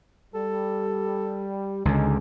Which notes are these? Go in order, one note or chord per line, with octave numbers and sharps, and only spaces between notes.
G3 A4
C#2 D3 D#4 G#4